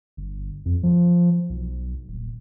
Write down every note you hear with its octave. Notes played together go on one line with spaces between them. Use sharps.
G1
F2
F3
B1
D#1